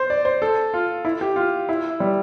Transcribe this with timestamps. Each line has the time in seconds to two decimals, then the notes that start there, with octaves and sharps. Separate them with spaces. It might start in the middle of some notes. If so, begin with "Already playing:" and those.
Already playing: C5
0.10 D5
0.25 C5
0.42 A4
0.74 F4
1.05 E4
1.21 G4
1.36 F4
1.69 E4
2.00 G3